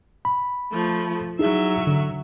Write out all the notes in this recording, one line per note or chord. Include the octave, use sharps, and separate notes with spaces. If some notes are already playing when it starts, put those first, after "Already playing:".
B5
F3 A3
F#3 D#4 E4 G#4 E5
D3